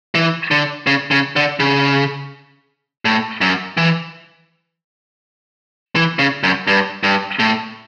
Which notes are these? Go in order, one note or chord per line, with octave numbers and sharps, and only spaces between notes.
E3
D3
C#3
C#3
D3
C#3
A2
F#2
E3
E3
C#3
F#2
G2
G2
A2